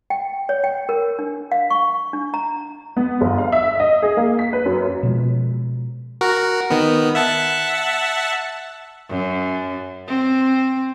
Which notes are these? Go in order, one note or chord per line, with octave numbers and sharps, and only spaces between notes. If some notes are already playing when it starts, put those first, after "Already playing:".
G5
C#5
G5
A#4
D4
F5
C#6
D4
A#5
B3
G1
F5
E5
D#5
G#4
A#3
B6
B4
F#2
B2 F3 G#3
F#4 A#4
D#3 B3
E5 F#5 A5
F#2
C4